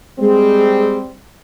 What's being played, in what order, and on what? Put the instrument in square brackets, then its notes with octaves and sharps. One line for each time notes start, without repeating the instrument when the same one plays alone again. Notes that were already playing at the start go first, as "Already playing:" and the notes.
[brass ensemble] G3 C4 [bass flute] G#3